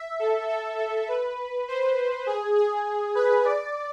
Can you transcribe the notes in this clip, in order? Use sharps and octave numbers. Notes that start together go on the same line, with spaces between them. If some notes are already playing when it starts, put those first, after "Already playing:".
Already playing: E5
A4
A4
A4
B4
C5
G#4
G#4
B4
D5